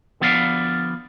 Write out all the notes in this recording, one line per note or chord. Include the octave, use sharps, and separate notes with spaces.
D3 F3 B3 D5 F5